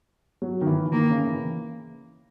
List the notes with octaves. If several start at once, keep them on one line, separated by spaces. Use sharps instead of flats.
F#3
D#3
E3
D#3 A#3
C#3
E3